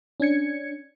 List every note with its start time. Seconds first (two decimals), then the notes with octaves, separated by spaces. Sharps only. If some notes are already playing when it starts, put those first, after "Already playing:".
0.20 C#4 D4 G#6 C#7